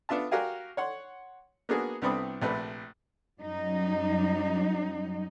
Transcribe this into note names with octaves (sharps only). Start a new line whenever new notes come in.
B3 D4 F4 E5 A5
F#4 G4 A#4 F5 G#5
C#5 F#5 C6
A#3 B3 D4 F#4 G#4
C2 B3 C4 D4 B5 D#6
A#1 C3 A3 B4
F#2 F#3 G3 D#4